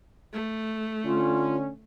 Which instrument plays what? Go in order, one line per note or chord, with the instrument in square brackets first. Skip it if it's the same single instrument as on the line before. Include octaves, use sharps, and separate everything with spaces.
[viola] A3
[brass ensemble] D3 C#4 [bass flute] F4